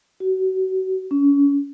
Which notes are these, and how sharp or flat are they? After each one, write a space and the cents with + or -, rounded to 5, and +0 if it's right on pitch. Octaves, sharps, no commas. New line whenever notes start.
F#4 +30
C#4 +30